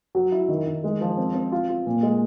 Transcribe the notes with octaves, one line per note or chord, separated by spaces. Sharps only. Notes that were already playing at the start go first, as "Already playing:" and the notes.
F#3
E4
D#3
D#3
G#3
F3
C4
C4
F4
F4
A#2
G#3